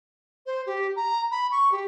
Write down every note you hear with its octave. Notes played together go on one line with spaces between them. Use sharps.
C5
G4
A#5
B5
C#6
G4